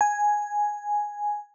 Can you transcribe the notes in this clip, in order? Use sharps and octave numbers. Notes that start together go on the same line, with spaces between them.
G#5